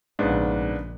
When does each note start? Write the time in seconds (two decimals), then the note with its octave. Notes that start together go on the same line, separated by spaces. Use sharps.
0.19 A#1 G#2 C#3 B3 D4